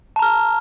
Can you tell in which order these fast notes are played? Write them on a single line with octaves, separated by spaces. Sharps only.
A5 A#5 F6